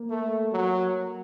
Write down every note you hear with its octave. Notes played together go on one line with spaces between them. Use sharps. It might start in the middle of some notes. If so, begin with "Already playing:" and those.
Already playing: A#3
A3
F#3